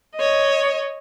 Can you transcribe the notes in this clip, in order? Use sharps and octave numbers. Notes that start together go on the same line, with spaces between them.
C#5 D#5